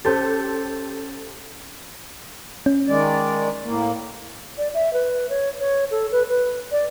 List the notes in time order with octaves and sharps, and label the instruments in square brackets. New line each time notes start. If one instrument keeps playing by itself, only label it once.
[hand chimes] C#4 G6 A6 [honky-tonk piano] G4 A4 C5
[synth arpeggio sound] C#4
[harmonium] D#3 G#3 D5
A2 A#3
[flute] D5
E5
B4
C#5
C#5
A4
B4
B4
D5